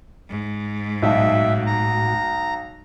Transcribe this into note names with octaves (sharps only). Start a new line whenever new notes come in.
G#2
B1 A2 F#4 D#5 E5 A5
A#5